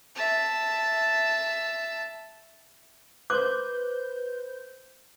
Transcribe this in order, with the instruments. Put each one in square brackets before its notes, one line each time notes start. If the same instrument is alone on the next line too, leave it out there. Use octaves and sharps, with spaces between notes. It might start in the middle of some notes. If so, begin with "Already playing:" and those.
[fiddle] E5 A5
[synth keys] B4 C5 G6 [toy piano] D6 [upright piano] F#6